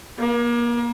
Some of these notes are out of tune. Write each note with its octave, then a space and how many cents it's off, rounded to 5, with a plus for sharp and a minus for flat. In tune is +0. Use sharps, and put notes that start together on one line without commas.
A#3 +35